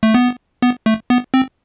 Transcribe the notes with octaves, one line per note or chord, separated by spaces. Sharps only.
A3
B3
B3
A3
B3
C4